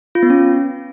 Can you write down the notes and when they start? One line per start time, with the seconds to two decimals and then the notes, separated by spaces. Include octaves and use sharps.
0.15 F4
0.23 B3
0.30 C#4